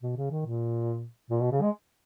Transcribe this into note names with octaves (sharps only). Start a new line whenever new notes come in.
B2
C#3
D#3
A#2
A#2
B2
C#3
G#3